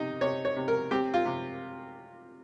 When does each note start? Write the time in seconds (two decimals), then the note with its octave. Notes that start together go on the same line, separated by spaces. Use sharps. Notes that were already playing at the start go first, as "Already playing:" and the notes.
Already playing: C3 D#4
0.21 C3 C#5
0.45 C#5
0.56 C3
0.68 A#4
0.91 C4 G4
1.14 F4
1.25 C3